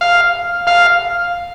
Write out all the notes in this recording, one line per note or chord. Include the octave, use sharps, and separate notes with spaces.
F5
F5